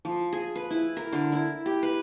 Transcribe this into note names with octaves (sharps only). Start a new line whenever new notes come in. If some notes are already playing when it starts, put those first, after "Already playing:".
F3
G#4
B4
E4
A#4
D3
E4
G4
B4